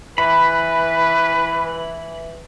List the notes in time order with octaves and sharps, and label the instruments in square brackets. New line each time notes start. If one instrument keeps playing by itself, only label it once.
[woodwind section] E3 [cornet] B4 [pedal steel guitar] B5